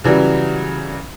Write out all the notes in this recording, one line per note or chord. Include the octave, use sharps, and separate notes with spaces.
C#3 E3 F#3 G3